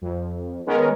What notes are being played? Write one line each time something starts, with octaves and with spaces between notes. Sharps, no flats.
F2
D#3 G#3 B3 C#4 A#4